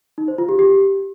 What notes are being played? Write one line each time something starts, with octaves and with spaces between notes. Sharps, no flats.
D#4
C5
F4
G4
G4